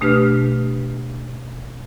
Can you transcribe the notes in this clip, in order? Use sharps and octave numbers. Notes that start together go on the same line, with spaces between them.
B2 A3 D4 G4 B4 F6